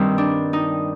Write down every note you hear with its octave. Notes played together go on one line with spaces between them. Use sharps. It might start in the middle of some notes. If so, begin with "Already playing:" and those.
Already playing: G2 D#3 G3 C4
D4
D#4